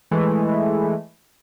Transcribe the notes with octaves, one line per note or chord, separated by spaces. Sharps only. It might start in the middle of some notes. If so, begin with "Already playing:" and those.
E3 G#3 A3